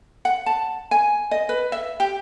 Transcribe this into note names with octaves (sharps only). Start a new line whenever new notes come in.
F#5
A5
G#5
D#5
B4
E5
G4